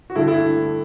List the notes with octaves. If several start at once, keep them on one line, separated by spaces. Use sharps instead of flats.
F#4
G2 D3 A3 E4
E4